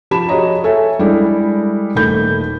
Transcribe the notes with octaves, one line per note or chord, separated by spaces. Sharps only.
F3 G4 A5 B5 E7
F#4 G#4 C#5 D#5 A#5
A4 C#5 E5 G#5
G3 G#3 D4 E4 A4
D#1 D#3 A3 B5 G6